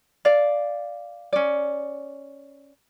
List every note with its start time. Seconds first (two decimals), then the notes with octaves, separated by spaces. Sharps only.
0.25 D5 F5
1.33 C#4 D5